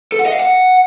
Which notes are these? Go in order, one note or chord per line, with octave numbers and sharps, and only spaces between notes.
A4
F#5
D#5
F5
F#5